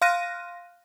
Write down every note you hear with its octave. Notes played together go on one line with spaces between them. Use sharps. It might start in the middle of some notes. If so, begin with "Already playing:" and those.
F5 C6 F6 F#6 A#6 D#7